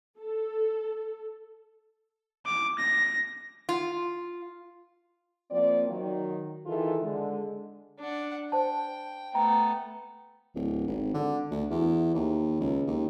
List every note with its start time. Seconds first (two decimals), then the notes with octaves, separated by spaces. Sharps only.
0.18 A4
2.46 D6
2.79 A#6
3.69 F4
5.51 F3 A#3 C4 D5
5.88 D#3 F#3
6.66 D#3 E3 F4 G#4 A4
7.03 D3 G#3
8.00 D4 F#5
8.52 C5 G5 A5
9.35 A3 B3 G5 A#5
10.55 D1
10.87 G#1
11.14 D3
11.51 D2
11.70 E2
12.15 D#2
12.60 C#2
12.87 D#2